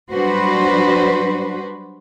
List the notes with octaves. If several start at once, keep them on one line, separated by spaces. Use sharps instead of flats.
F#3 G3 D4 F#4 B4 C5